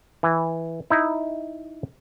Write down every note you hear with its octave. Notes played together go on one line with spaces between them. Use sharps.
E3
D#4 E4